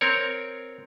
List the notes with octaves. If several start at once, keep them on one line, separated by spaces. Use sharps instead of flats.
C4 A#4 C#5